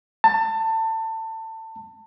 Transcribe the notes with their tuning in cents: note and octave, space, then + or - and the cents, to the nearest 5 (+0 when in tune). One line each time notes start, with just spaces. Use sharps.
A5 +25